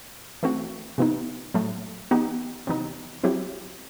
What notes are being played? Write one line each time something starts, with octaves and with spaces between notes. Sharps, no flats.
E3 A3 C4 F#4
C3 E3 B3 D#4
A2 F#3 A3
E3 B3 D#4 G4
C3 E3 B3 D#4
F#3 C4 E4 G4